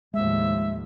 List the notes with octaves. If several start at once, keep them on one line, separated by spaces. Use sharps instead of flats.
D#2 A2 F3 G#3 E5